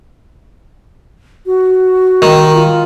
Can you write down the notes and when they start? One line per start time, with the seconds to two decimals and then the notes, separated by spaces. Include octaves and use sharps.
1.46 F#4
2.22 D#3
2.53 F4